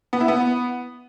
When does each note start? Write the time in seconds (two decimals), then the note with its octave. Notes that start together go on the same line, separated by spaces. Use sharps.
0.13 B3
0.20 E4
0.28 B3